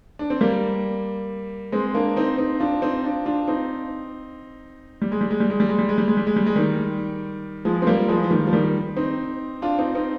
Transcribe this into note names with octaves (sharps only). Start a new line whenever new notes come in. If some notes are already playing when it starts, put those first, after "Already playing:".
D4
C4
G3 A#3
G#3 C4
A#3 D4
C4 D#4
C4 D#4
D4 F4
C4 D#4
D4 F4
D4 F4
C4 D#4
G3
G#3
G3
G#3
G3
G#3
G3
G#3
G3
G#3
G3
G#3
G3
G#3
G3
G#3
D#3 G3
F3 G#3
C4
G3 A#3
F3 G#3
F3
D#3 G3
F3
D#3 G3
C4 D#4
D4 F4
C4 D#4
C4 D#4